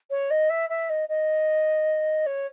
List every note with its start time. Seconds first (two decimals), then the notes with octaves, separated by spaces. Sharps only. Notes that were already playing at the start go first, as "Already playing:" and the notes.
0.10 C#5
0.30 D#5
0.49 E5
0.69 E5
0.89 D#5
1.08 D#5
2.26 C#5